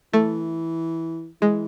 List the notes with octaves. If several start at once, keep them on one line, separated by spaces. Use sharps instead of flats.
E3 A3
E3 G#3